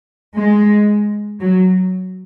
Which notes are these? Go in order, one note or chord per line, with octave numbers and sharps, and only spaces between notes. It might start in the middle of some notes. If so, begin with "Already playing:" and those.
G#3
F#3